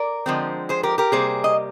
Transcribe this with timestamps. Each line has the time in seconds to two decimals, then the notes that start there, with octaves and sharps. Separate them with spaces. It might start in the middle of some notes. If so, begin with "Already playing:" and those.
Already playing: A#4 D5
0.26 D3 F3 G#3 C4
0.69 G#4 C5
0.83 G4 A#4
0.98 G4 A#4
1.12 C3 G3 A#3 G#4 C5
1.44 D#5